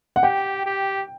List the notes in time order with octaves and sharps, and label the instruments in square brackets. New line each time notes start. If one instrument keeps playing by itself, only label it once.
[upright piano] F#5
[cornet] G4 [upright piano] G5
[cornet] G4